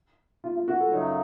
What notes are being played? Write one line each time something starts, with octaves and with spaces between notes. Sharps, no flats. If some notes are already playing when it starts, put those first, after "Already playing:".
F4
F4
F#4
A4
F#2 C#3 F#3 A3 D#4 C#5